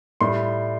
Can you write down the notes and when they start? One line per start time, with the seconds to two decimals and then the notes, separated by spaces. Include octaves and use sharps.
0.21 A2 G3 C6